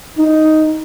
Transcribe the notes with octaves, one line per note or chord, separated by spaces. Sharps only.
D#4